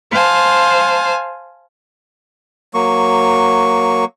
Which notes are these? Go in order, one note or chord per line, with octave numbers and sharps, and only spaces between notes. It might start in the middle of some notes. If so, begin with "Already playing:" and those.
C5 F5 G#5 A5
F#3 A#3 C#6